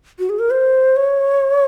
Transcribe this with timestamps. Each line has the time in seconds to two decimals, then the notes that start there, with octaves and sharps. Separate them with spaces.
0.19 F#4
0.29 G#4
0.39 A#4
0.50 C5
0.96 C#5